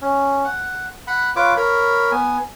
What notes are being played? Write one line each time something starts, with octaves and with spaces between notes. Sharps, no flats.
C#4
F#5
F#5 B5
F4 B4 C#5 D6
A#4 C#5 B5
B3 G#5